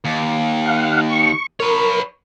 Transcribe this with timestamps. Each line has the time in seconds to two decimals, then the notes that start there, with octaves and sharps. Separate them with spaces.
0.05 D#2
0.66 F5 F#5
1.10 C#6
1.60 A#4 B4 C#5